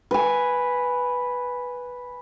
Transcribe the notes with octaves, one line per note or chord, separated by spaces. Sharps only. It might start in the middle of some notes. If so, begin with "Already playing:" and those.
B4 G#5